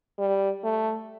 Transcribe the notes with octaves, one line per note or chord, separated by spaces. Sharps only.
G3
A3